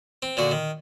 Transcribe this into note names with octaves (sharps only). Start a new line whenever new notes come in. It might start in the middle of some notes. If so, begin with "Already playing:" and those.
C4
A#2 D3 F#4
D#3